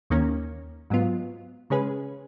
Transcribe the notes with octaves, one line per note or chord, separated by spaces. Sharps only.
D#2 D#3 A#3 C#4
G#2 F#3 B3 F4
C#3 G#3 C#4 G#4 B4